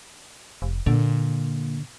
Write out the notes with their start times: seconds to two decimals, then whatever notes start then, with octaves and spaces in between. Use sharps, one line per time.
0.62 F1
0.86 A#2 D3